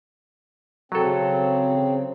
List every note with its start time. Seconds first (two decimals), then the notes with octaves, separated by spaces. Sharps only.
0.92 C#3 F#3 C4 A4